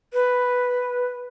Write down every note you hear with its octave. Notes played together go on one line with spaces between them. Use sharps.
B4